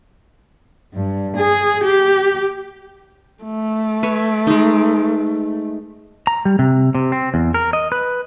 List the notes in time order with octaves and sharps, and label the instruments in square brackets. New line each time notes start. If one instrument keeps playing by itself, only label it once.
[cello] G2
G#4
G4
[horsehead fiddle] A3
[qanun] B4 C#5 E5
G#3 D#4
[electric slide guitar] A#5
G3
C3
C3
C4
E2
A#4
D#5
B4